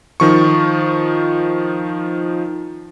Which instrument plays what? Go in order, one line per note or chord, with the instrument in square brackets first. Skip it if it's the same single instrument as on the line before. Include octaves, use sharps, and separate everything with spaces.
[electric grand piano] D#3 F3 C#6